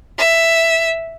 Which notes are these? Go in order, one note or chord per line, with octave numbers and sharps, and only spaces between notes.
E5